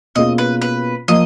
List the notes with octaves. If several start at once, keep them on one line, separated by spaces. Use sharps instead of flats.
B2 A#3 C#4 F4 G#4 D#5
B4
B4
F3 A#3 D#5